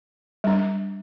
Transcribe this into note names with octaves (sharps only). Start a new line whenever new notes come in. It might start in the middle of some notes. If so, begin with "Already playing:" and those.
G3 D4